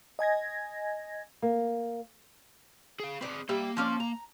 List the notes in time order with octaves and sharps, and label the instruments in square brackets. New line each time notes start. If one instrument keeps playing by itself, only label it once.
[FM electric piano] D#5 G#5 G#6 A#6
[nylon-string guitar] A#3
[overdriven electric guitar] G#4 F5
[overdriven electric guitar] C4 G#4 [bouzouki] B4 D5
[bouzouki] G3 E5 [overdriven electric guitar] A#3
[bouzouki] F3 C#4 D5
A#5